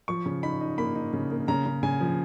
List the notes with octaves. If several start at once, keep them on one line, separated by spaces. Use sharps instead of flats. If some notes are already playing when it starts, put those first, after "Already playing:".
F3 C#6
C#3
D#4 B5
D#4
A#3 B5
D#4
C#3
A#3
C#3 A#5
C#3
C#3 G#5
F3